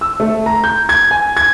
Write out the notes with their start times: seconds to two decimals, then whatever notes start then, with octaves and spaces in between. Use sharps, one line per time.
0.01 E6
0.20 A3
0.46 A#5
0.64 G6
0.89 G#6
1.11 G#5
1.37 G#6